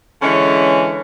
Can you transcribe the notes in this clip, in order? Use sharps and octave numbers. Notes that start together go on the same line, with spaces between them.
D3 E3 G#3 C#4